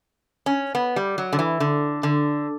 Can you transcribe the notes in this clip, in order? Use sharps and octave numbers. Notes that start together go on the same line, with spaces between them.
C#4
B3
G3
F#3
D3
E3
D3
D3